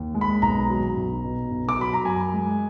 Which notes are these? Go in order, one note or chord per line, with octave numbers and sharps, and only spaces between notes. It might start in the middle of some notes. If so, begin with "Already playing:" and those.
Already playing: D#2
G#3
B5
B1 A#5
F#3
B1
B2
B1
D6
F#3 B5
A#5
F#2 G#5
G#3